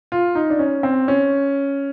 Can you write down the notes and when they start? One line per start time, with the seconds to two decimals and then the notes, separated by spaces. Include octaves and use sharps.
0.12 F4
0.35 D#4
0.50 D4
0.59 C#4
0.83 C4
1.08 C#4